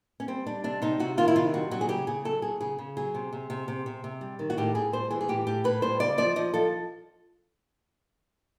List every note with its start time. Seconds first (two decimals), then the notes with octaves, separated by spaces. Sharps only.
0.20 C#4
0.28 G3 C4
0.46 G3 D4
0.64 C3 D4
0.82 C3 D#4
1.00 C3 F#4
1.18 D#3 F4
1.28 E4
1.36 C3 F4
1.54 G3 F#4
1.71 F#3 F#4
1.81 G#4
1.89 C#3 G4
2.07 C#3 G#4
2.25 F#3 A4
2.42 F#3 G#4
2.61 C#3 G#4
2.79 C#3
2.97 F#3 G#4
3.15 C3
3.33 C3
3.50 C3
3.68 C3
3.86 C3
4.04 C3
4.21 G3
4.39 D#3
4.50 F#4
4.58 A2 G4
4.75 A2 G#4
4.93 G3 C5
5.11 E3 G#4
5.21 G#4
5.29 A2 G4
5.47 A2 G4
5.64 A2 B4
5.82 G3 C5
6.00 C#3 D5
6.18 F3 D5
6.36 F3 D#5
6.54 F3 A4